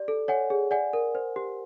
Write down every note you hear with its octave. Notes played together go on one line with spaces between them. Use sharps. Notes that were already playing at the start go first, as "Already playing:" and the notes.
Already playing: G4 D5
A4
C#5 F#5 G#5
G#4
D5 F#5 G#5
A#4
C5
G4